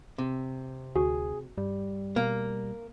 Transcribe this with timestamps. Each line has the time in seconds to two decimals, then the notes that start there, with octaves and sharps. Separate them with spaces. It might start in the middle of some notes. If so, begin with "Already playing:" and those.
0.18 C3
0.96 D2 F#4 G#4
1.58 G2 G3
2.16 B2 A#3